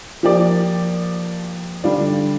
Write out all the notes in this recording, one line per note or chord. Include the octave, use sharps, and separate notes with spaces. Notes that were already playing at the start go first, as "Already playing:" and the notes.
F3 A#3 G4 D5
D3 G3 D4 F4 D5